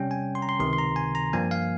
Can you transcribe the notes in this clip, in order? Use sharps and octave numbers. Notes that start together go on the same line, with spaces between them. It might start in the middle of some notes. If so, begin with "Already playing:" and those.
Already playing: C3 G3 C#4 G5
G#5
C6
A#5
C6
C#2 C3 D#3 C6
C6
A#5
G#5
A#5
G2 F3 A#3 G#5
F5